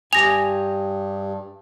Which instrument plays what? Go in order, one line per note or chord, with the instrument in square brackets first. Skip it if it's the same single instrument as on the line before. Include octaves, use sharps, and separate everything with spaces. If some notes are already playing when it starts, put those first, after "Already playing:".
[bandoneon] G2 [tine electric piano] G4 G5 D#6 [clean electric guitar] G#5 [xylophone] A#6 F7